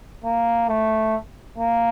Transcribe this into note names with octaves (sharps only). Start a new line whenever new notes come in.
A#3
A3
A#3